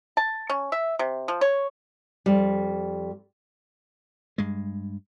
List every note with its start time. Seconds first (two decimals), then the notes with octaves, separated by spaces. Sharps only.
0.17 A5
0.50 C#4
0.72 E5
0.99 C3
1.28 F3
1.41 C#5
2.26 F2 G3
4.38 G2 G#3